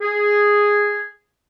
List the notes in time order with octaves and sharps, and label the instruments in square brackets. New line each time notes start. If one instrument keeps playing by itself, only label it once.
[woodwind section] G#4